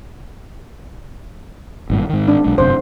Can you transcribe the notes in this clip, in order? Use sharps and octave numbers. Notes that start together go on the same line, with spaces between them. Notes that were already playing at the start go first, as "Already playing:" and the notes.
G#1 G2 A#2
G#2 D#3
D4
B1 G#3
G1 F#2 C3 C5